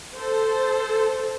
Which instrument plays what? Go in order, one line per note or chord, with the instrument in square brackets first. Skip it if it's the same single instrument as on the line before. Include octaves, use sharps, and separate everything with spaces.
[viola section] A4 C5